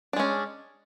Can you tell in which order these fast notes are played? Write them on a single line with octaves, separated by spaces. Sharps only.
D4 G#3 C#4